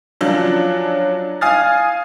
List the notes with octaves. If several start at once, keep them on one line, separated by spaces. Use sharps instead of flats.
F3 F#3 C#4 D4
F5 G#5 D#6 F6 A6